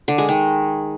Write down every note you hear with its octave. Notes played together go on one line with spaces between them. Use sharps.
D3
G#3
D#3